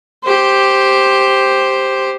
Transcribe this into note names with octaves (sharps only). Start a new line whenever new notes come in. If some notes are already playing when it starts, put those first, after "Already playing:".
G4 C5